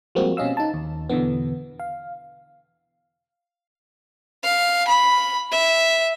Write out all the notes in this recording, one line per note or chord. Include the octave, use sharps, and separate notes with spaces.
F3 G3 G#3 A#3 C4 F#4
B2 C4 C#4 D#5 F5 E6
D#4 A5
D#2
E2 B2 D3 E3 B3
F5
F5
B5
E5